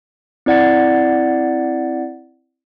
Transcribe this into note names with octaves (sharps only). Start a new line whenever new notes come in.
C4 E4 D5 F#5 A6 C#7